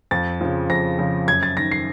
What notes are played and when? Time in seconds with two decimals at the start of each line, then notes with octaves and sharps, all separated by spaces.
0.11 F2 A6
0.41 C#3 F3
0.70 F2 A#6
0.99 C#3 F3
1.28 F#2 G#6
1.43 A6
1.57 D#3 A#6
1.71 C7